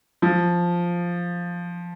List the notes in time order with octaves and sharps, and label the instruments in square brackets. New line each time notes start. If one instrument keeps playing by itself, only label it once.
[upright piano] F3